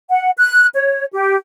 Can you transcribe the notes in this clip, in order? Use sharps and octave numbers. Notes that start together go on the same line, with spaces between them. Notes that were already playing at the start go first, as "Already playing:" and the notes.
F#5
F#6
C#5
G4